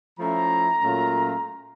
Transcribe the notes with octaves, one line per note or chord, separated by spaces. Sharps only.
F3 A3 C#4 E4 A#5
A#2 F#3 A3 C#4 F4